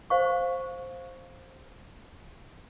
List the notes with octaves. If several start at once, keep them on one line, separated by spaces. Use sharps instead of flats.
C5 F5 C#6